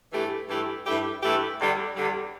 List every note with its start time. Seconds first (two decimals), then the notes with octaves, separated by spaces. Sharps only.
0.13 G2 E3 A3 E4 G4
0.49 G2 E3 A3 E4 G4
0.86 G2 E3 A3 E4 G4
1.23 G2 E3 A3 E4 G4
1.59 E2 D3 G3
1.96 E2 D3 G3